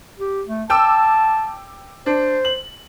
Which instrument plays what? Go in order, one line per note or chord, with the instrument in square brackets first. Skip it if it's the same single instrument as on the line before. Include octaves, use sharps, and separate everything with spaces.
[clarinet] G4
A3
[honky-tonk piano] G5 D6 E6 [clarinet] A5
[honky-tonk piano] D4 [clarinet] C5
[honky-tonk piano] F#7